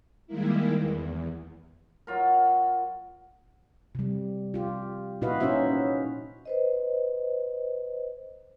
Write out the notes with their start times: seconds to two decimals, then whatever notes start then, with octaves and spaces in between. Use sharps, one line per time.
0.27 D#3 G3 G#3 A#3 E4
0.78 E2
2.07 F#3 F4 A#4
3.95 C3 G3
4.54 F4 G4
5.22 A#2 E4 F#4 B4 D#5 F5
5.40 A#2 C#4 D#4 F#4 C5 E5
6.45 B4 C5 D#5